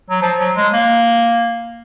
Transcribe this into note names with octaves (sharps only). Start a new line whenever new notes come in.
F#3
F3
F#3
G#3
A#3